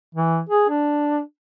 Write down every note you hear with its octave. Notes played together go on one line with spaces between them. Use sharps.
E3
G#4
D4